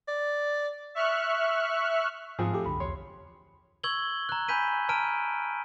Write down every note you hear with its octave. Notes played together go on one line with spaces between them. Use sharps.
D5
E5 C#6 F6 F#6
F2 G#2 F3 G#4 E6
A3 G4 A4
C2 F#2 D3 B5
B1 E2 C#5 C6
C#6 E6 G#6 F#7 G7
A#5 F#6
G#5 B5 G6 B6 D#7
A5 A#5 F6 D7 D#7